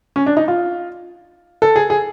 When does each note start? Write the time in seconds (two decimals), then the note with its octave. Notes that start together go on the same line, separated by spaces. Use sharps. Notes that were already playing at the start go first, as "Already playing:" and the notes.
0.16 C#4
0.26 D4
0.37 D#4
0.48 F4
1.62 A4
1.76 G#4
1.90 G#4